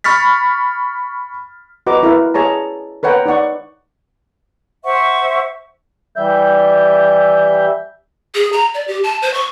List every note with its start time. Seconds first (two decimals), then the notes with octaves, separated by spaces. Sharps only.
0.04 B5 C#6 F6 A6 B6
1.87 F#4 B4 D#5 A#5 D6
2.03 E4 A#4 B4 F5
2.34 G#4 C#5 A5 A#5
3.03 A#4 B4 C#5 F#5 G5 A#5
3.26 D#4 D5 F#5 C#6
4.85 C5 E5 F#5 C#6
6.16 E3 G3 E5 G6
8.35 G#4
8.52 A#5
8.74 D5
8.88 G4
9.04 A5
9.22 C5
9.34 C#6